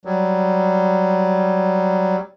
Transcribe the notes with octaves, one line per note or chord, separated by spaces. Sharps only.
F#3 G3